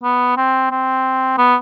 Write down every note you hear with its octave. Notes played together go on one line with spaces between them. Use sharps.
B3
C4
C4
B3